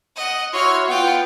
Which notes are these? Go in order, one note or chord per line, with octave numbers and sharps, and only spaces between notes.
D#5 F#5
E4 F#4 C#5 C6 F6
B3 F4 F#5 G5